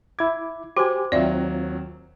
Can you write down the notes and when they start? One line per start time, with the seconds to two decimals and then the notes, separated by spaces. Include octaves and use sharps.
0.19 E4 D6 G#6
0.77 F#4 G4 C5 G#5 C6 D6
1.12 D#2 F#3 C4 F4 D5 E5